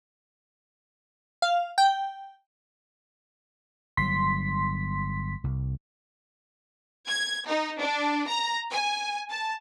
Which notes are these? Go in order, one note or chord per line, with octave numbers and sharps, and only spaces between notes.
F5
G5
G1 F#3 C6 B6
C2
G#6
D#4
D4
A#5
G#5
A5